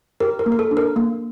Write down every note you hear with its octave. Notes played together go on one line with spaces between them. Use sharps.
G4 A#4
A#4
A#3
A#4
A4
D4
A#4
A#3